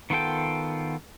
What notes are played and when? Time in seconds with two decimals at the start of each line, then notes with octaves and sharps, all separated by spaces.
0.10 D#3 B3 F4 A4 G5